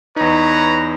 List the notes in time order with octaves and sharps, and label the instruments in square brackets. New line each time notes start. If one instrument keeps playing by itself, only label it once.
[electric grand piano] E2 D#4 [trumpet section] B4 C#5 A#5